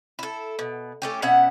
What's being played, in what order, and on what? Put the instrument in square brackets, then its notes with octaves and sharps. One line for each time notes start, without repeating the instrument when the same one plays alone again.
[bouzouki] E4 A4
B2
A3 C#4 G4
B2 C#4 E5 F#5